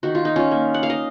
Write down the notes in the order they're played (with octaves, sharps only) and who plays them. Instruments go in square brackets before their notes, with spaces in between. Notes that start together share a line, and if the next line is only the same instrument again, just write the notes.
[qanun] D#3 F#4
F4
D#4
C#4 F4
A#3
F#5
F5
D#5